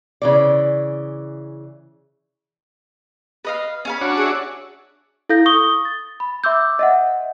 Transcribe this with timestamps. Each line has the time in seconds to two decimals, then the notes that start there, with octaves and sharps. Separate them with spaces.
0.22 C#3 E3 D5
3.45 B4 D#5 F5
3.85 C#4 F5 B5
4.01 D4 F#4 C#5
4.17 G#4 E5
5.29 E4 A4 F5 G6 A#6
5.46 C#6 D#6 G7
5.85 A6
6.20 B5
6.44 E5 C6 D6 E6 G6
6.79 D#5 E5 F#5